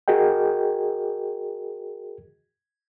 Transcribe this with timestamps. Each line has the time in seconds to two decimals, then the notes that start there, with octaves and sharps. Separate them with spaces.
0.08 F#4 G#4 A#4 D#5 G5